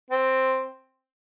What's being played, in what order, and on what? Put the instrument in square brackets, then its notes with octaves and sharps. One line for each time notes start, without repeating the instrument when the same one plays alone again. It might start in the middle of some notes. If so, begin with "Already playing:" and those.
[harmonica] C4